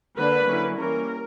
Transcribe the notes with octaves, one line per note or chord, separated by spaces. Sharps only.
D3 A#3 D4 B4
D3 F#3 A#3 C#4 E4
E3 G3 A#3 C#4 A#4